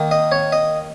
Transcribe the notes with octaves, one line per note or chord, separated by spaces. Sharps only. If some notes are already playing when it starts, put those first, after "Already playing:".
Already playing: D#3 A#3 D#4
D#5
C#5
D#5